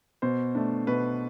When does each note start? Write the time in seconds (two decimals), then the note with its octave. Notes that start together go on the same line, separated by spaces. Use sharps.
0.22 B2 C5
0.55 A3 D4
0.87 B2 B4